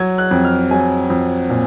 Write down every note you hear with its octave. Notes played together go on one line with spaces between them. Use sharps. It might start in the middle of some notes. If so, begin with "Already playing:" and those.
Already playing: F#3 G#6
F#6
F2
F6
F#3 G#5
F2
A#2